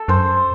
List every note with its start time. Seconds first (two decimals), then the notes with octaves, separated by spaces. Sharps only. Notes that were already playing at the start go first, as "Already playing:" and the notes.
Already playing: A4
0.08 F#2 C5